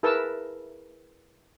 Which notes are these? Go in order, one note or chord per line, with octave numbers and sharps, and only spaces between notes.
E4 G#4 A#4 B4 A5 E6